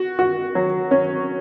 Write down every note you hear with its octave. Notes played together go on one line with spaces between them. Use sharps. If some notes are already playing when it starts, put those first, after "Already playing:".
Already playing: F#4
F#4
F#3
C#4